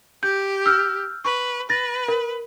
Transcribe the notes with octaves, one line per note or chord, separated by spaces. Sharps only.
G4 G6
E6 F6 G6
B4 C#6
B4 A6 A#6
A#4